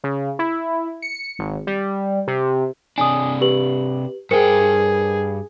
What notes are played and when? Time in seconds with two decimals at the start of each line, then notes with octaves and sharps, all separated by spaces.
0.04 C#3
0.39 E4
1.02 C#7
1.39 G#1
1.67 G3
2.27 C3
2.98 C3 D4 G#5 D#6
3.41 G4 B4 F#7
4.31 G2 G#4 A#4 C5 G5 C#7